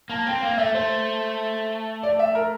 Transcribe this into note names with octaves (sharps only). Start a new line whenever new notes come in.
A#3 A5
C4 G5
A#3 F5
A3 E5
A3 C5
D5
E5
A#4